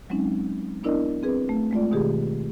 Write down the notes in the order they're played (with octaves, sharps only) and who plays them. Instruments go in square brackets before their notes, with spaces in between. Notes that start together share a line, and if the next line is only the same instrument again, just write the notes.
[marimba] F#3 G#3 C4 C#4 D#4
B3 D4 E4 A#4 D5 D#5
C4 G#4 B4
A3
G#3 A3 F4 D5
B2 D#3 G4 G#4